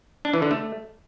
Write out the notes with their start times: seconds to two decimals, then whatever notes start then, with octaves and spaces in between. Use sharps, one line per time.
0.25 D4
0.34 E3
0.42 D3
0.51 A3